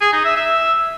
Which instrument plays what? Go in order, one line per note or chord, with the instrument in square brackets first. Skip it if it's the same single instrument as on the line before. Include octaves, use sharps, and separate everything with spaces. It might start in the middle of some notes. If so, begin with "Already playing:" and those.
[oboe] G#4
D#4
E5
E5